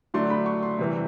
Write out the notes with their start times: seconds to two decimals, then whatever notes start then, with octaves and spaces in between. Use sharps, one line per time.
0.14 D3 F#3 A3 D4 C6
0.30 B5
0.46 C#6
0.63 C6
0.79 C3 E3 G3